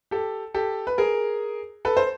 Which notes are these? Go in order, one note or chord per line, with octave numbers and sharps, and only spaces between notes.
G4 A4
G4 A4
B4
G#4 A#4
A4 B4
C5